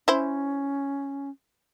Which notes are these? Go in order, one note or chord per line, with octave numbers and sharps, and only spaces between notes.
C#4 E4 C5